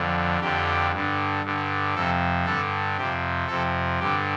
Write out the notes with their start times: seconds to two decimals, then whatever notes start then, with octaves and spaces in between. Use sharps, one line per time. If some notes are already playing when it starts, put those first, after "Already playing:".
Already playing: F2 D3
0.41 F2 D3 G4
0.92 G2 D3
1.44 G2 D3
1.95 F2 C3 A4
2.46 G2 D3 A4
2.97 F2 C3 G4
3.47 F2 C3 A4
4.00 G2 D3 G4